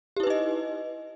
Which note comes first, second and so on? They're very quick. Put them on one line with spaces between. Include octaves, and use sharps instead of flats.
G4 E4 B4 D#4 D#5